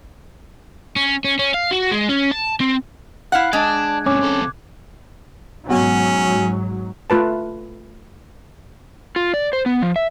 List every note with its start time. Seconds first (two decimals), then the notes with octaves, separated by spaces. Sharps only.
0.96 C#4
1.24 C#4
1.39 C#4
1.54 F5
1.71 F#4
1.91 G#3
2.09 C#4
2.31 A5
2.60 C4
3.32 E4 F5 F#5 F#6
3.53 G#3 D4 D5 A5 G#6
4.06 G#2 C3 C#4 D6
4.21 C3 A4
5.69 G#2 B2 F#3 C#4 F#4
7.10 A3 F4 B4 A5
9.16 F4
9.34 D5
9.53 C5
9.66 B3
9.82 F3
9.96 E5